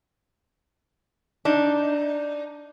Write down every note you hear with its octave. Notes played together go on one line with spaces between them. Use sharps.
D4 D#4